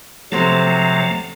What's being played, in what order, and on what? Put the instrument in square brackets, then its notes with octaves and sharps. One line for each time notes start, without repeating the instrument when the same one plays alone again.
[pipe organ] C3 F#3 A#5 [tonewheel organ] F3 A3 [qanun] C4 G4 A4